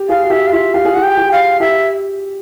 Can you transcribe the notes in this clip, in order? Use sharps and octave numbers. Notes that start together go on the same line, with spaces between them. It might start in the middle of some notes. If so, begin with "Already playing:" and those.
Already playing: G4
G#4 F5
F#4
G4 E5
F5
F4 E5
G4 F5
G#4
G4 F#5
G5
G4
F5
G4 E5